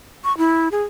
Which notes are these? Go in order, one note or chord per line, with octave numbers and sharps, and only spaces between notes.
C#6
E4
G#4